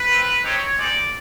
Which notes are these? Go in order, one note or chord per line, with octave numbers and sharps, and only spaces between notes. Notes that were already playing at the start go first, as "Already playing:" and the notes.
Already playing: B4
C4 F4
C4 D#4 G4 C#5
G#3 C4 D#4 G4 D5